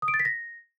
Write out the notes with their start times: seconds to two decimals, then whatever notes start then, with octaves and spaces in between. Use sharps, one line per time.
0.02 D#6
0.08 D7
0.14 A6
0.20 B6
0.25 A#6